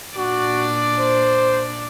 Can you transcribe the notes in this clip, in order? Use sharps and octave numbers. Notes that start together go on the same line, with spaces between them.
A#2 D4 F#4 D5
C5